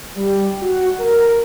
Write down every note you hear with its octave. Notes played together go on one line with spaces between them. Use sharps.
G3
F#4
A#4